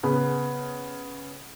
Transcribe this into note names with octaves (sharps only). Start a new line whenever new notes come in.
C#3 B3